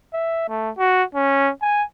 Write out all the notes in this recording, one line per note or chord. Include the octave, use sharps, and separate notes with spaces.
E5
A3
F#4
C#4
G#5